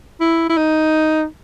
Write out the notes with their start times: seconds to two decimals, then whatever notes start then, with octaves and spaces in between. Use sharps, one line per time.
0.21 E4
0.49 E4
0.57 D#4